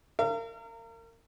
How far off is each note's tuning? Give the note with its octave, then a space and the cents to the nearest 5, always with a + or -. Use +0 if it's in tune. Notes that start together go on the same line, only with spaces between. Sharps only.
A#4 -30 F5 -40